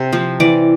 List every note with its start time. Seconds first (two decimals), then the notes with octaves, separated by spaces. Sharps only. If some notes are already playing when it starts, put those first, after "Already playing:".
Already playing: C3
0.12 F3 C4
0.40 E3 D5